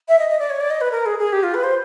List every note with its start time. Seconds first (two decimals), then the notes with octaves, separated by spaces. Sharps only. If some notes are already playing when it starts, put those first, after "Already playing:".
0.08 E5
0.19 D#5
0.29 D#5
0.39 D5
0.50 C#5
0.61 D5
0.71 D#5
0.81 B4
0.92 A#4
1.06 G#4
1.19 G#4
1.33 G4
1.43 F4
1.54 B4
1.64 C5